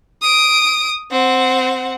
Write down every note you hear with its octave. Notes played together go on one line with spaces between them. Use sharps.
D#6 D7
C4 F#5